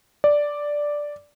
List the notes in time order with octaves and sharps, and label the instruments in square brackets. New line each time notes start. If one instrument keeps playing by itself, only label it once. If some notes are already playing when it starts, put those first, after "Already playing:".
[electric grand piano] D5